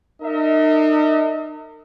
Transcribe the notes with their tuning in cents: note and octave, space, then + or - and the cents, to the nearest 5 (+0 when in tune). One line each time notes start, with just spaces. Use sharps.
D#4 -40 A#4 -40 D#5 +45